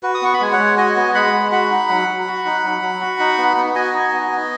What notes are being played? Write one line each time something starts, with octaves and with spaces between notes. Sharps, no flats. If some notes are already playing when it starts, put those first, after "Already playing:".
F#4 B4
D#6
B3 C#6
B5
G#3 G#5
C#5 F#5
G#3
F#4 D#5 G#5
B3
G#3 F#5 B5
G#3
F#4 F#5 B5
D#4
F#3
F#3
F#4
D#4
F#3
F#3
F#4
D#4
B3
B3
F#4 D#5 G#5
D#4
B3
B3